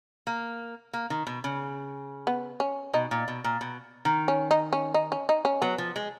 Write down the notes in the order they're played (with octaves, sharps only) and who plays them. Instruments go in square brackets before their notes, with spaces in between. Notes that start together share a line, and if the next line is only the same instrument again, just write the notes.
[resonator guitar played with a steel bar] A#3
A#3
D#3
B2
C#3
[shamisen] B3
C#4
[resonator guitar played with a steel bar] B2 [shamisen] D#4
[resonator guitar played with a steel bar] A#2
B2
A#2
B2
D#3
[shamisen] C#4
D#4
C#4
D#4
C#4
D#4
C#4
[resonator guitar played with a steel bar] F#3 [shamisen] B3
[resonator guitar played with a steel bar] F3
G#3